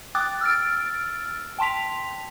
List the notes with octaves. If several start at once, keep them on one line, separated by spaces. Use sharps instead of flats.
G5 D6 D#6 F#6 A6
E6 F6 A6 D7
G5 A5 C6 B6 F7